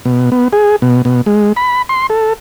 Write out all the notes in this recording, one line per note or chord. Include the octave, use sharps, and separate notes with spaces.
B2
B3
G#4
B2
B2
G#3
B5
C6
A4